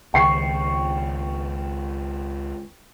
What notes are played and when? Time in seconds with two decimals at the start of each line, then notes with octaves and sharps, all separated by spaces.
0.14 C#2 D#3 G5 C#6 C7